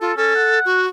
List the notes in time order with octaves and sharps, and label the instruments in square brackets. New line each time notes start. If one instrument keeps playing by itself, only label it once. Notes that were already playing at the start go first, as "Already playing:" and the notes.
[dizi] F4 [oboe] A4
[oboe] C#4 [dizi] A4
[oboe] F#5
[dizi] F#4